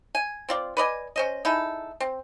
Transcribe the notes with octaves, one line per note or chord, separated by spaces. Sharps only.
G#5
C4 F4 D5
B4 D5 D#5 G#5
C#4 C5 D#5
D#4 E4 G#4 A4
C4